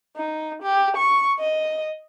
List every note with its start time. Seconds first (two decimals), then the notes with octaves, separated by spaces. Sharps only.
0.17 D#4
0.62 G4
0.97 C#6
1.39 D#5